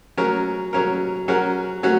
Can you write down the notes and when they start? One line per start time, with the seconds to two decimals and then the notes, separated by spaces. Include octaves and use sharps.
0.18 F#3 C#4 A#4
0.73 F#3 C#4 A#4
1.28 F#3 C#4 F#4 A#4
1.83 F#3 C#4 F#4